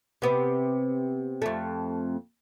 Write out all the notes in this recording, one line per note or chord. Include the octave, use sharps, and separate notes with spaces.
C3 B3
F2 A3